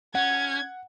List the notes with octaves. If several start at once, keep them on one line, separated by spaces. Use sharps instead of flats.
C#4 F#5 G#6